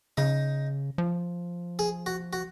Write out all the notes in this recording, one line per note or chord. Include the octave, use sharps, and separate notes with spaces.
C#3 D#4
F3
G#4
F#4
F#4